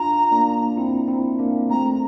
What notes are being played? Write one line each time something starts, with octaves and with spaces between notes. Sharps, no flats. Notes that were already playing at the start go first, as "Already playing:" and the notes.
Already playing: D4 F4 A#5
A#3 D4
C4 E4
C4 E4
A#3 D4
A3 C4 A#5